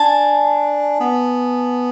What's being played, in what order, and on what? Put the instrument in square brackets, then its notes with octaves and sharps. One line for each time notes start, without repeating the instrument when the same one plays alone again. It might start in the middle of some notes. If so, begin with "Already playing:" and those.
Already playing: [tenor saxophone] D4 [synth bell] G#5 A5
[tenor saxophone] B3